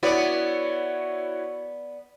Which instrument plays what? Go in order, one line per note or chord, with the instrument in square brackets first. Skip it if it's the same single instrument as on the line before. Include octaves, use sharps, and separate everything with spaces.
[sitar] B3 D5 [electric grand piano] E4 F#4 C#5